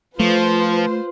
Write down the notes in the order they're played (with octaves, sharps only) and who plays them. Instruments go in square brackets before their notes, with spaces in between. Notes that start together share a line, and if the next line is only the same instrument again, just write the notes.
[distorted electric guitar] F3 [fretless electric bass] A3 [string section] F4 B4 C5